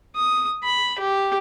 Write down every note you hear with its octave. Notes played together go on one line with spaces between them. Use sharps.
D#6
B5
G4